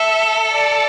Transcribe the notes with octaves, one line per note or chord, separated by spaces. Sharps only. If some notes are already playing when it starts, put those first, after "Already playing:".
Already playing: A4 E5
D5